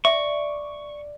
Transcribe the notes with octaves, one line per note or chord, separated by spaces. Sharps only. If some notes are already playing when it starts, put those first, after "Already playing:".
D5 E5 C#6